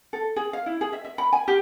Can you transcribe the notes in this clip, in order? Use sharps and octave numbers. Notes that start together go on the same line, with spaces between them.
A4
G#4
F5
E4
G#4
E5
E5
B5
G#5
G4